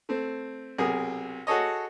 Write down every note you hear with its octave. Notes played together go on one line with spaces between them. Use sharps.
A3 C4
B1 C3 G#4 A#4 D#6
F#4 G#4 A4 C#5 D#5